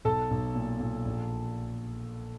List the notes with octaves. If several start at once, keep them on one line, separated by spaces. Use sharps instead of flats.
B1 A4 A5
B1
A#2
A#2
A#1